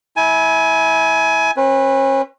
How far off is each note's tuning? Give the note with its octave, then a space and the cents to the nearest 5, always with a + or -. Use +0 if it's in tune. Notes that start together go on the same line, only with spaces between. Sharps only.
E4 -25 G#5 +20
C#4 -40 B4 +0